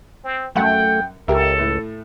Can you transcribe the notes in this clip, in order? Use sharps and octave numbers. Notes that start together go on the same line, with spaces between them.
C4
F#2 A3 F#5 G5
C#2 G4 A4 A#4 E5
A2 A3